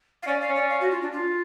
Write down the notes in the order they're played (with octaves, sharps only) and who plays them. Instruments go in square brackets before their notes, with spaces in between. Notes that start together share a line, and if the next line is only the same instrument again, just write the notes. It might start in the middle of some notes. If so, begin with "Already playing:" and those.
[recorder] F5
[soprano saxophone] C#4 [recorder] D5
[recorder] F5
[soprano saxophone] C#4
[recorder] D5
F5
F#4
F4
D4
F4